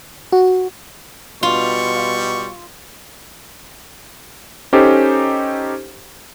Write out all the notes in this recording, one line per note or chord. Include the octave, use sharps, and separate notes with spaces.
F#4
B2 G3 F4 C#6
C#4 D#4 G4 A4 C5